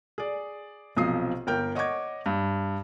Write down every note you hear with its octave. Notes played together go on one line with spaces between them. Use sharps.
G#4 D5
B1 C3 F3 D#6 C7
G1 A#4 G5 G6
C#5 D#5 F#5 C#6 D6 G#6
G2